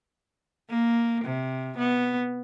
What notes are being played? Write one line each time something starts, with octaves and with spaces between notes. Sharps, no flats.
A#3
C3
B3